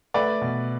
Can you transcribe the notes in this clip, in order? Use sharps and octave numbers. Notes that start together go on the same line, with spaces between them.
A3 B4 D5
B2